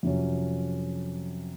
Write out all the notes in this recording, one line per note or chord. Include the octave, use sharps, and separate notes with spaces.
F2 C3 F#3 C#4